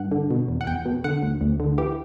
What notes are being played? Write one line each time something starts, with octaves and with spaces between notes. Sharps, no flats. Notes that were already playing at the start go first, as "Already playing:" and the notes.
Already playing: G2 F#5
D3
B2
E2
F#5
E2 G5
B2
D3 F#5
D2
D2
D3
E3 G4